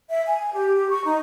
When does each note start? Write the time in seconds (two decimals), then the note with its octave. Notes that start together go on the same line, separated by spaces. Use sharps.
0.10 E5
0.27 G#5
0.53 G4
0.75 G4
0.90 C#6
1.05 D#4